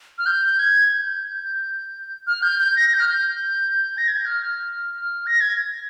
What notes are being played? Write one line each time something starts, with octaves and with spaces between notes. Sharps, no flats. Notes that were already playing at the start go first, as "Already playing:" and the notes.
F6
G6
G#6
G#6
G6
F6
G6
G6
A#6
G6
F6
G6
A#6
G#6
G6
F6
A#6
G#6